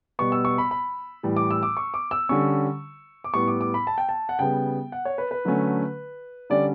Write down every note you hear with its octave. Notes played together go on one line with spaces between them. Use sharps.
B2 G3 B3 C#6
E6
C#6
B5
B5
A2 E3 G3
D6
E6
D6
C#6
D6
E6
D3 G3 C#4 C#6
D6
A2 G3 B3 C#6
D6
D6
B5
A5
G5
A5
F#5
C#3 G3 B3 G5
F#5
C#5
B4
B4
D3 F#3 A3 C#4
D3 G3 C#4 D5